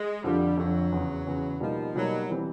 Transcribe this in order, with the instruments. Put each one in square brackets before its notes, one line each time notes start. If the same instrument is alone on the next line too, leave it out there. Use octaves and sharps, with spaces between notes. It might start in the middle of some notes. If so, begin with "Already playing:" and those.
Already playing: [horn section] G#3
[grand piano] F2 D3 F3 [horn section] G3
[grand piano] F2 D3 F3 [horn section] F#3
[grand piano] E2 C#3 E3
E2 C#3 E3
[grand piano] B2 G3 A#3 D#4 [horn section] F3
[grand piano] B2 G3 A#3 D#4 [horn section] F#3
[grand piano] E3 G3 C4